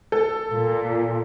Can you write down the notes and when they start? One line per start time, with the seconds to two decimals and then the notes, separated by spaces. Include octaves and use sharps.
0.12 A4
0.50 A#2